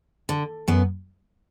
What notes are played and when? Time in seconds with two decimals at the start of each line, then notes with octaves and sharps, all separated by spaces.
0.29 D3
0.68 F#2 B3